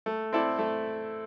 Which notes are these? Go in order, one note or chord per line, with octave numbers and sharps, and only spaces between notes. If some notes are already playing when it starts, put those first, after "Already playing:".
A3
C4 E4 A4 D5
A3